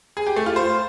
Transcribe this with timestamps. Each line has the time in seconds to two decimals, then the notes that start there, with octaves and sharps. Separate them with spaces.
0.17 G#4
0.27 G4
0.36 A3
0.46 F4
0.56 C5